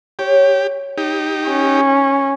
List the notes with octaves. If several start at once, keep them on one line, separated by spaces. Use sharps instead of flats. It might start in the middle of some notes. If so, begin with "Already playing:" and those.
G4 C#5
D#4 G4
C#4